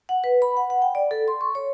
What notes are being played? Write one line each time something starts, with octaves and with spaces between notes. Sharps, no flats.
F#5
B4
B5
F#5
F#5
G5
D5
A4
C6
C#6
C#5